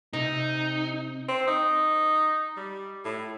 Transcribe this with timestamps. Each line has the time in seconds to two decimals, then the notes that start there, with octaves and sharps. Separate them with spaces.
0.13 C3 C4 D#4
1.29 C4
1.48 D#4
2.57 G3
3.05 A2